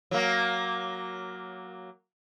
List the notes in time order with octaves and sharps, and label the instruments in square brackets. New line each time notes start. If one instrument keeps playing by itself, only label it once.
[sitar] F#3 A#3